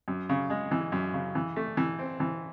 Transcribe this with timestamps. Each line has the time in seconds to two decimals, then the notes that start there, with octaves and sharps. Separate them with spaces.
0.08 F#2
0.29 C#3
0.50 G#3
0.71 E3
0.92 F#2
1.14 C#3
1.35 E3
1.56 A3
1.77 E3
1.99 C4
2.20 E3